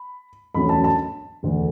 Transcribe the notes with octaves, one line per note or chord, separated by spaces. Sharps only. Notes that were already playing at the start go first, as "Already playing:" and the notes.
Already playing: B5
E1 D2 D3 F#3 C#4 B5
A5
A5
E1 D2 D3 A3